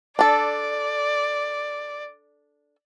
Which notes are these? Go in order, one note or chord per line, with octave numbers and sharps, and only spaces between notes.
D4 A4 D5